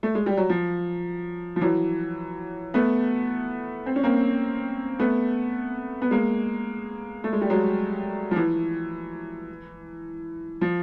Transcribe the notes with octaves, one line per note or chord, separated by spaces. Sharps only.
A3
G#3
G3
F#3
F3
F3
E3 F#3
A3 B3
C4
C#4
A#3 C4
A3 B3
B3
G#3 A#3
A3
G#3
G3
F#3 G#3
F3
E3
F3